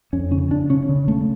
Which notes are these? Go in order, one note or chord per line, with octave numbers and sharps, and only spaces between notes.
F2 C#4
C#3 C#4
C#3 D4
C#3 C#4
C#3
C#3 A3